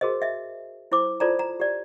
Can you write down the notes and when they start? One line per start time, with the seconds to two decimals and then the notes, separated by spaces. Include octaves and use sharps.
0.01 F#4 G#4 A#4 C5 D#5
0.22 D#5 E5
0.92 E4 C5 D6
1.20 F4 A4 C5 D5 A5 A#5
1.39 A#5
1.60 G4 D5